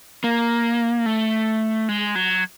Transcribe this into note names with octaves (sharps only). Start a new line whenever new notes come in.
A#3
A3
G#3
F#3